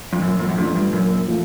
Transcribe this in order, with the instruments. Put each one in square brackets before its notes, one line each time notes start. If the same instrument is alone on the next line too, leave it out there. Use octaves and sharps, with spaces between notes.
[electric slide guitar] F2
[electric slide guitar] F#2 [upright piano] A#2
[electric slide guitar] F2
F#2
[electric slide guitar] F2 [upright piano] F3 A3 D4
[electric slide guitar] G2
[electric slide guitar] F#2 [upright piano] A#2
[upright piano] F3 A3